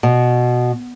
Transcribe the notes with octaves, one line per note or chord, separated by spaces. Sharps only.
B2